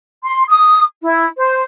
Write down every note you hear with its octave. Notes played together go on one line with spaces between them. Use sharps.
C6
D#6
E4
C5